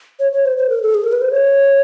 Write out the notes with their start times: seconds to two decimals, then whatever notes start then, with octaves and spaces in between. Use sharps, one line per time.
0.20 C#5
0.33 C#5
0.45 C5
0.57 C5
0.69 A#4
0.82 A4
0.95 G#4
1.04 A#4
1.12 B4
1.21 C5
1.31 C#5